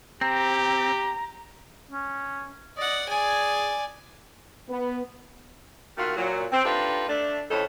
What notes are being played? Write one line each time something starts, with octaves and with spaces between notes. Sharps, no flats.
C4 G4 A#5
C#4
D5 D#5 F#5
G#4 D5 G#5
B3
D#3 A3 A#3 F4 F#4
A#2 F#3
C4
A3 D4 D#4 F4 G4 B4
A3 D4
F2 A2 C#4 E4 A4 D#5